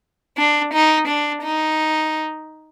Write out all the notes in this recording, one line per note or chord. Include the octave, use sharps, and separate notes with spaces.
D4
D#4
D4
D#4